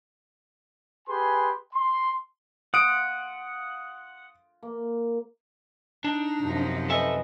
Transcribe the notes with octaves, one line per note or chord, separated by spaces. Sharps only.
G4 G#4 B4 G#5 C6
C6
F4 F#5 D#6 D7
A#3
D4 D#4
F#2 C3 F3
A4 B4 D#5 E5 G#5